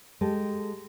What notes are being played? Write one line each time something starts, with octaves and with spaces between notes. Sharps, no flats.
G#3 G4 A4